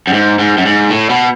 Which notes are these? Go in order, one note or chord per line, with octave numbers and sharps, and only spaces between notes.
F#2
G#2
G#2
F#2
G#2
A2
B2